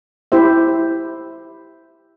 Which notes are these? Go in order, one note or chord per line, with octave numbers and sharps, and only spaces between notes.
E4 G4 C5 E5